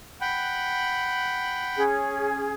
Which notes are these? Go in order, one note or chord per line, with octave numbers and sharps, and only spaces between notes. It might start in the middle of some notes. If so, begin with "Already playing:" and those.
F#5 G5 B5
C#4 G#4